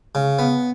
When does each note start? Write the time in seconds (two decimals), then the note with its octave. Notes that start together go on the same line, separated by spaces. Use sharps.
0.15 C#3
0.39 B3